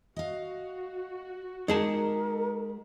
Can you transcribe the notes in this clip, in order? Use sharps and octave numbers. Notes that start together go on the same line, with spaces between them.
F#4 D#5 F5
G#3 D#4 G4 G#4 A#4 F#5 A5